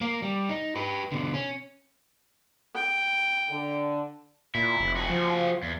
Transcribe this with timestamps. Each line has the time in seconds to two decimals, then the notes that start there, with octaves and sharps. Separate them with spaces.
0.01 A#3 A#4
0.22 G3
0.49 D#4
0.76 G4 B4
1.12 B2 D3
1.34 C#4
2.74 G5
3.51 D3
4.55 A#2 E4
4.80 F1
4.96 F#4 G#4
5.10 F3
5.63 E2